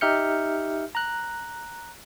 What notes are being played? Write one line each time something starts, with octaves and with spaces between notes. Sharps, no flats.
D#4 G4 E5 F6 G6 C#7
A#5 F#6